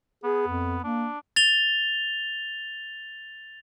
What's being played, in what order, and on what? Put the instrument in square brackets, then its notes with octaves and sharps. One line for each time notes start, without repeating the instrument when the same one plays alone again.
[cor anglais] B3 [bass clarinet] G#4
[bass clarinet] F2
[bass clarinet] A#3 [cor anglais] D4
[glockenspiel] A6 F7 G7